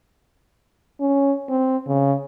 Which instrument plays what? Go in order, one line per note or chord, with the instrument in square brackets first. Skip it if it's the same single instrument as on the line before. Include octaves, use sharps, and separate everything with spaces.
[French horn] C#4
C4
C#3